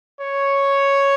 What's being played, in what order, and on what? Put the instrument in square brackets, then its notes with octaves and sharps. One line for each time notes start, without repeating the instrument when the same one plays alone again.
[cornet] C#5